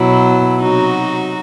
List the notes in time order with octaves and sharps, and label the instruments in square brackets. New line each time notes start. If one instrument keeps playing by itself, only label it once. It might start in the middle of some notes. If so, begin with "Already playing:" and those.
Already playing: [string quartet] B2 F#3 E4
C3 F#3 D#4 F#4